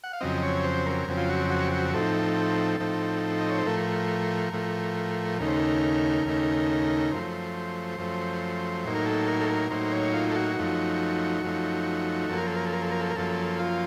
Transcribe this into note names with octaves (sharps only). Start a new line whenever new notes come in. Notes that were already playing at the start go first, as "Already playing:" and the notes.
F#5
F5
F2 C#3 F#3 C4 D#5
C#5
C5
A#4
F2 C#3 F#3 C4
F4
F#4
F#4
F#4
A2 F3 C4 D#4 A4
A2 F3 C4 D#4
D#5
C#5
C5
A2 F3 A3 A#4
A2 F3 A3
D#2 C#3 A3 D#4 A#4
C5
A#4
D#2 C#3 A3 D#4
F#2 F3 A3 C5
F#2 F3 A3
A2 F#3 A#3 D#4
A#4
A4
A#4
A4
A#4
A2 F#3 A#3 D#4 C5
C#5
F4
A4
F#4
F#2 F3 A3 D#4
F#2 F3 A3 D#4
F#2 F3 A#3 A4
A#4
A4
A#4
A4
A#4
A4
A#4
A4
A#4
F#2 F3 A#3 A4
F4